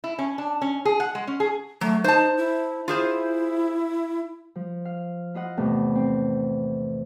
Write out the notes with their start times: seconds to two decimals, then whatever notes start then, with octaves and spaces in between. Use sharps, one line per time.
0.04 E4
0.19 C#4
0.38 D4
0.62 C#4
0.85 G#4
1.00 F#5
1.15 G#3
1.27 C#4
1.40 G#4
1.81 F#3 A3
2.04 D#4 C5 A5
2.38 E4
2.88 E4 F4 G#4 C5
4.55 F3
4.85 F5
5.34 E4 F4 D#5 F#5
5.57 E2 A2 C3
5.95 C4